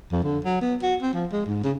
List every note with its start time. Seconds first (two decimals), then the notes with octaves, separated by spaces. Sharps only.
0.12 F2
0.24 D3
0.44 F#3
0.61 B3
0.82 F#4
1.02 C4
1.14 F3
1.32 G#3
1.46 G#2
1.64 C#3